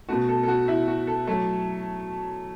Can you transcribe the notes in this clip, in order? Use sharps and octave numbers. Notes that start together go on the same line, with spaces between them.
B2 A3 F#4
A4
A4
F#4
E4
F#4
A4
F#3 A3